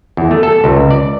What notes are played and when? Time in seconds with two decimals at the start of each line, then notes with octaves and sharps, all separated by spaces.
0.17 E2
0.31 A3
0.43 A4
0.64 C#2
0.91 D5